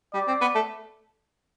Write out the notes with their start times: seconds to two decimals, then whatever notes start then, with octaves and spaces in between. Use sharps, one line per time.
0.13 G3 D5
0.28 C4
0.41 B3
0.55 A3